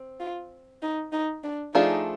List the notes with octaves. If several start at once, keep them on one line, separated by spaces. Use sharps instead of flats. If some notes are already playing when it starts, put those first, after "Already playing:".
Already playing: C4
F4
D#4
D#4
D4
F3 A3 D4 D#4 F4 G#4